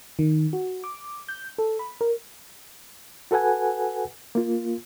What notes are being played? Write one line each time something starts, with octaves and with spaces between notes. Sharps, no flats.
D#3
F#4
D6
G6
A4
B5
A#4
F#4 A4 B4 F#5 G#5
A#3 F4